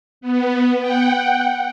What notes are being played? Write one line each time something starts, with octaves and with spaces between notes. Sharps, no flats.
B3
F#5 G5